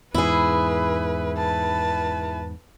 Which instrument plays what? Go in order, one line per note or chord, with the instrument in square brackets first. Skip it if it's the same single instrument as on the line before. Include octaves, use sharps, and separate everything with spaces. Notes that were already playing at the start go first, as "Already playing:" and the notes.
[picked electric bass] E2 G#2 [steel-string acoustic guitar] E4 G#4 [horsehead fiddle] B4
[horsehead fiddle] B4 A5